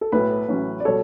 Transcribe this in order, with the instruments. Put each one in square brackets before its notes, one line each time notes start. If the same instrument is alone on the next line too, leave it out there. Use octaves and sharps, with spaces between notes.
[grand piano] A4
[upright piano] B1 A2 F#3 [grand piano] B4
[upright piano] A1 A2 F#3 C#4
[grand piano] D5
[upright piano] B2 G3 [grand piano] A4 C#5